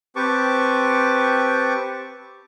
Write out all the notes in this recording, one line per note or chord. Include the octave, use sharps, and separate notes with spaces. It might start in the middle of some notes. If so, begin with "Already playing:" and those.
C4 G4 B4 A5 C#6 D6